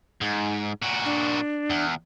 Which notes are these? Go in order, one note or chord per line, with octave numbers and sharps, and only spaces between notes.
G#2
A#2 F#4
D4
E2